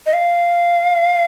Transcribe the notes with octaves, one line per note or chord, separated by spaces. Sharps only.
D#5
F5